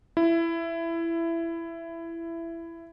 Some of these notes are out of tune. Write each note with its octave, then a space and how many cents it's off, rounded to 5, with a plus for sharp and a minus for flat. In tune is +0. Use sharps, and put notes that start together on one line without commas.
E4 +15